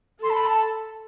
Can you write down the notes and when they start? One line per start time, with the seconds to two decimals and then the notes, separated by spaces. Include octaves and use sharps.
0.23 A4 C6
0.30 A5
0.35 B5
0.47 A5